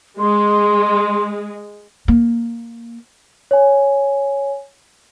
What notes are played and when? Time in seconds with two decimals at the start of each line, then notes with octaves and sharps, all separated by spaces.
0.19 G#3 C6
2.08 A#3
3.51 C#5 G#5